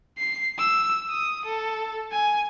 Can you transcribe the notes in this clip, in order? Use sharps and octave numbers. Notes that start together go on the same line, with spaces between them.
C7
E6
D#6
A4
G#5